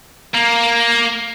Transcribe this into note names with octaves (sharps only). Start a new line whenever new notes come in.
A#3